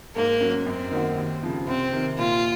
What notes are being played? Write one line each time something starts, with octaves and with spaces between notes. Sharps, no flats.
G#2 A#3
F#3 C#4
F#2 C4
D#3 A#3 D#4 F#4
D#2
C#3 F3 C4
C2 C4
C3 D#3
A#2 F4